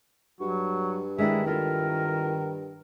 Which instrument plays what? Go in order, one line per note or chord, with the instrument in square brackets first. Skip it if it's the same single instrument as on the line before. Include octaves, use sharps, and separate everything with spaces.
[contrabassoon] G2 [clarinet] F#3 [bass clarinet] F#4
[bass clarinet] D#3 [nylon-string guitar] G#3 D4 E4 [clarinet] E5
[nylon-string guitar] E4 F4 A4 [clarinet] A#4